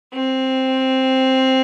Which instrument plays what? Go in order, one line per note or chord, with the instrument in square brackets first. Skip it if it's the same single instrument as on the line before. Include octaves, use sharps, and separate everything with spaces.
[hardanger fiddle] C4